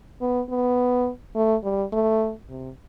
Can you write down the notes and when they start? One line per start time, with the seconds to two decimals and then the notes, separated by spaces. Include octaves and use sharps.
0.21 B3
0.50 B3
1.35 A3
1.64 G3
1.93 A3
2.49 C3